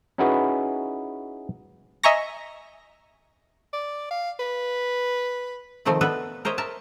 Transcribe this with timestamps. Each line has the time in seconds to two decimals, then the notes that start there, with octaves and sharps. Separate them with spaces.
0.18 C#4 D#4 E4 F#4 G#4 B4
2.03 D#5 E5 G#5 A#5 C#6 A#6
3.73 D5
4.11 F5
4.39 B4
5.85 C3 D#3 F3 A3 C4
6.01 B3 D4 A4 B4 E5
6.45 A#4 C5 C#5 D#5 E5
6.58 A#4 E5 A5